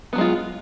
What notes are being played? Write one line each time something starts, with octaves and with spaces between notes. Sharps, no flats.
F#3 G#3 B3 F4